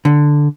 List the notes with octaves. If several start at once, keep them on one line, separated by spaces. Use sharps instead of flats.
D3